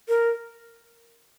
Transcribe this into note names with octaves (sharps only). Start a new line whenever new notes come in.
A#4